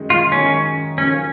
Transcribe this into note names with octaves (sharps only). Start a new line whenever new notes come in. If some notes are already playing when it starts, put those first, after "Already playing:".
Already playing: F#2 D#3 G#3 D#4
F4
F#2 D#3 G#3 C#4 D#4 G#4
F2 C#3 F#3 A#3 C#4